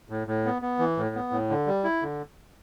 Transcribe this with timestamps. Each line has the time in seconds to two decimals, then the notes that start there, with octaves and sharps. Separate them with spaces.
0.09 A2
0.27 A2
0.45 B3
0.62 B3
0.79 E3
0.97 A2
1.15 B3
1.31 A2
1.50 D3
1.67 G3
1.84 E4
2.02 D3